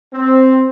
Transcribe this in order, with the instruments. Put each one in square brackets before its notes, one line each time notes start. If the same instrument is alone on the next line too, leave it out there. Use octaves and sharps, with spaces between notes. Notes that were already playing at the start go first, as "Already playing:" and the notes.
[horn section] C4